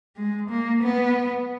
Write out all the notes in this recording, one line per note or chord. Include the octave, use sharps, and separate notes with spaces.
G#3
A#3
B3